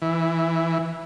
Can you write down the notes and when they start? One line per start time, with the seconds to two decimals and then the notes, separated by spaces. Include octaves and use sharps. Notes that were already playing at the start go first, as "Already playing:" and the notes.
0.02 E3